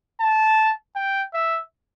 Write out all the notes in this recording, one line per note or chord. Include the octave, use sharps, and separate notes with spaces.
A5
G5
E5